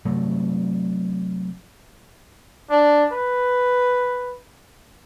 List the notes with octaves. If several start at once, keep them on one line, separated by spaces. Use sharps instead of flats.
C3 F#3 A3
D4
B4